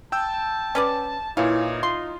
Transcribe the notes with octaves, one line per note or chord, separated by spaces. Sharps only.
G5 A5 E6 G6
C#4 B4 D5
A#2 E3 D#4 E4 C#5 F5
F4 C6